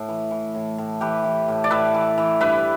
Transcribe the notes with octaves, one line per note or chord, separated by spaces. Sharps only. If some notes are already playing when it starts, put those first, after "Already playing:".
Already playing: A2
E3
E3
A2
A2
E3 G4 B4
E3
A2
D5
A2 B4 E5
E3
E3
G2 B4 E5